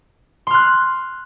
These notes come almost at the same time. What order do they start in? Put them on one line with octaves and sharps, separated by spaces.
C6 F6 F#6